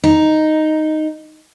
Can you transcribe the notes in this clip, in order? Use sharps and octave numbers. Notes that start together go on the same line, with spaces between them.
D#4